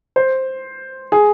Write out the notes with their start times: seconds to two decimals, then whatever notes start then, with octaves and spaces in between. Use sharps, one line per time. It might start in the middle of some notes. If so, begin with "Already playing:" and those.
0.16 C5
1.12 G#4